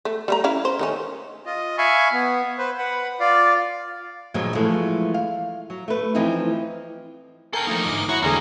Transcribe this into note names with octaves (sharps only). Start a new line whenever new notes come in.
A3
G3 A3 A#5
C#4 E4 F5
C5
D#3 A3 C#4
F4 D#5
E5 F5 G#5 B5 C#6
B3
B4 C5
B4 F#5 B5
F4 D5 F5
G2 A#2 D#3 F3 F#3 G#3
E3 F3 G#3 A3
F5
F#3
A3 B4
E3 F3 A3 C4 D#4
A4 A#4 G5 G#5 G6 C7
E3 F3 A3 A#3 D#4
G1 G#2 D6
E4 F#4 C#5 A#5
E2 D3 F#3 G3 A3 G#4 G#5 A#5